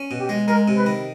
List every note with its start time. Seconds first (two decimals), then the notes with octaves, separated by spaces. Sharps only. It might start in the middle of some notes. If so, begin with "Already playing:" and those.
Already playing: C#4
0.11 B2
0.20 G4
0.29 G#3
0.48 G#3 A#4
0.68 C3
0.77 B4
0.86 D#3